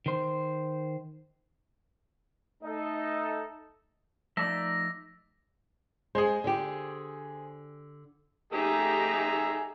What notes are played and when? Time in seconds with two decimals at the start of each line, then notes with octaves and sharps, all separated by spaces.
0.06 D#3 C5
2.64 A3 D#4 A4 D#5
4.37 F3 A3 D#4 D5 E5 A5 A#6
6.15 G#3 G#4 C5
6.44 D3 G4
8.53 A3 D#4 G4 G#4 E5 A#5